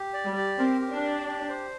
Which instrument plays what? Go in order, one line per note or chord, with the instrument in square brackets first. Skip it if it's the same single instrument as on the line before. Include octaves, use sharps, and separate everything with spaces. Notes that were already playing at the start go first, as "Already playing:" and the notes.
Already playing: [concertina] G4
D5
[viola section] G3
[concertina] G4
[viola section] C4 [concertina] A#4
[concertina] G4
[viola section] D4
[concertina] D5
G4
C5